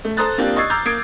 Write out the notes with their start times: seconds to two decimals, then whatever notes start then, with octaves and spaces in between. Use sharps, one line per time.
0.05 A3
0.17 A4 C5 A#5 D#6 F#6 A6
0.38 A#3 C4 D4 F4 G4
0.56 D#5 C#6 E6 G#6 A6 C7
0.70 A#5 D6 E6 F6 G6 A6
0.85 A#3 D#6 G#6 C7 D7